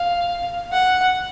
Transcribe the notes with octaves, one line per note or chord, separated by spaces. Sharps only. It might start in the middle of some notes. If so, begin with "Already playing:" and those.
Already playing: F5
F#5